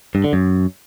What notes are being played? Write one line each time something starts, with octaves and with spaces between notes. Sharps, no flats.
G2
D3
F#2